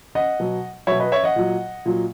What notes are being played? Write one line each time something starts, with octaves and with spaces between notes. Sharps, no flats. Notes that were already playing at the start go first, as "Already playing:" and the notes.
D#5 F#5
B2 F#3
B2 F#3 C#5 E5
B4 D#5
C#5 E5
D#5 F#5
A#2 F#3
A#2 F#3